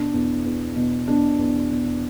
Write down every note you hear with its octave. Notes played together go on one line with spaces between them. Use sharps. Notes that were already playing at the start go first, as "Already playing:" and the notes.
Already playing: B2 D4
E2
E2
B2
B2 D4
E2
B2